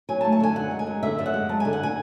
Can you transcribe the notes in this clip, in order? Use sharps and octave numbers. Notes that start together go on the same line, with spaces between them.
F#3 G#5
A5
A3
A5
D3 G#5
F#2 F#5
G#3
G#5
F#2
D3 E5
F#2 E5
F#5
G#3
F#2 A5
D3 G#5
F#5
G#5